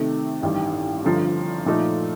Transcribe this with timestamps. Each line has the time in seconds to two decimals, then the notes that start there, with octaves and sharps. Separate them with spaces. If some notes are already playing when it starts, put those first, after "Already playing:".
Already playing: C3 D#3 A3
0.42 A1 G2 D#3 G3
1.05 G1 G2 D3 F3
1.66 A#2 F3 A3 D#4 A4